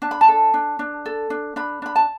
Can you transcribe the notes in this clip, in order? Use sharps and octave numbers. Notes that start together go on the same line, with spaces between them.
D4 A5
B5
A5
A4
D4
D4
A4
D4
D4 B5
D4 B5
A5